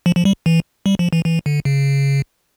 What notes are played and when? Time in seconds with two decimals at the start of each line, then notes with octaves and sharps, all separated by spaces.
0.06 F3
0.16 F3
0.25 G3
0.46 E3
0.86 G3
0.99 F3
1.13 E3
1.25 E3
1.46 D3
1.65 C#3